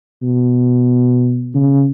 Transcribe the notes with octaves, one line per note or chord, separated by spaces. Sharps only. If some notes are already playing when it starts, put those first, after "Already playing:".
B2
C#3